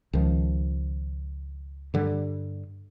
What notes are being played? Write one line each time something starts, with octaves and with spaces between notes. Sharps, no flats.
C#2 D#3 F3
G2 D3 G3